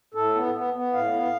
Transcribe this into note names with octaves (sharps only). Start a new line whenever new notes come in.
A2 A4
B3
B3
B3
A2 F5
B3